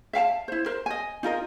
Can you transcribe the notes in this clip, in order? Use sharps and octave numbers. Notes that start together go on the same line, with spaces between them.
E5 F5 G5 A5
E4 C5
A#4 C5
D#5 G#5
D#4 F4 A#4 D#5